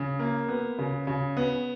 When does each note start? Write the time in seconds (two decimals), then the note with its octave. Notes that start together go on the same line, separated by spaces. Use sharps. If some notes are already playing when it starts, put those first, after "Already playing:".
Already playing: C#3
0.19 A#3
0.48 B3
0.78 C#3
1.07 C#3
1.37 B3